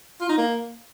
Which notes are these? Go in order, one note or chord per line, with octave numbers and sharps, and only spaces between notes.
F4
D#4
A#3